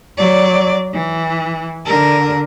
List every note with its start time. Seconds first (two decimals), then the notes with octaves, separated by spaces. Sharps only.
0.18 F#3 D5
0.93 E3
1.86 D3 A#4